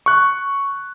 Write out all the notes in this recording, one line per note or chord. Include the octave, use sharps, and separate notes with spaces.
C#6 F#6